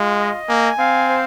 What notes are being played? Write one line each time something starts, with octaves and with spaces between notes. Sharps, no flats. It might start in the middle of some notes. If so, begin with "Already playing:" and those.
Already playing: G#3 F4
D#5
A#3 G#5
C4 F5
C5